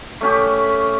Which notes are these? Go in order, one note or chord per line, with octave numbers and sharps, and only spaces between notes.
A3 C#4 G4